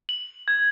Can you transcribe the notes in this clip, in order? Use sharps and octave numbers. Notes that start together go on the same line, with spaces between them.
F#7
G#6